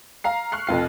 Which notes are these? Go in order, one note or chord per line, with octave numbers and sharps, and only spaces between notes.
F5 A#5 C7
C#6 F6 F#6 C7
F1 F2 F4 C7